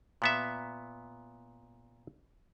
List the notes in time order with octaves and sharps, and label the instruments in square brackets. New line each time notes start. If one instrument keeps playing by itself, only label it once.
[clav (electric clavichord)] A#2 B3 E5